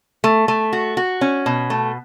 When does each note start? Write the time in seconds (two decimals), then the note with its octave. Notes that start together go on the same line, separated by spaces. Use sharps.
0.24 A3
0.48 A3
0.73 F#4
0.97 F#4
1.21 C#4
1.46 B2
1.70 A3